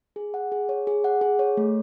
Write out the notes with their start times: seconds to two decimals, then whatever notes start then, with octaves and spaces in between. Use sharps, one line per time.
0.16 G#4
0.34 F#5
0.52 G#4
0.69 C#5
0.87 G#4
1.04 F#5
1.21 G#4
1.39 C#5
1.57 A3